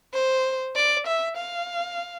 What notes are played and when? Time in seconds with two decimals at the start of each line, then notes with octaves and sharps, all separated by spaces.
0.13 C5
0.76 D5
1.06 E5
1.37 F5